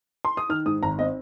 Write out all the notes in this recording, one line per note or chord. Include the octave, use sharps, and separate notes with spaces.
C6
D#6
D#3 F6
G#2 D#6
G#1 A#5
C4 D#5